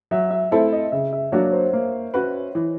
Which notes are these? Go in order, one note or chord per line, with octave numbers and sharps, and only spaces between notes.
F#3 E5
E5
A3 C4 E4 A4 E5
D#5
C#3 E5
E5
F#3 A#3 D4 F#4 C#5
C#5
C5
A#3
C#4 F#4 B4
E3